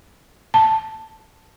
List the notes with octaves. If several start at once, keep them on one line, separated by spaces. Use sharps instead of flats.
A5